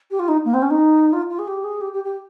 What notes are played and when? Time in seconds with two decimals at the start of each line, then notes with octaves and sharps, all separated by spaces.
0.10 G4
0.19 F4
0.28 D#4
0.44 A#3
0.53 C4
0.62 C#4
0.70 D#4
1.12 F4
1.29 F4
1.38 G#4
1.47 G4
1.63 G#4
1.80 G4
1.92 G4
2.03 G4